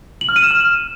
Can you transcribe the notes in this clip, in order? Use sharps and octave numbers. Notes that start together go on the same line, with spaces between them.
F#7
F6
D#7
E7
F6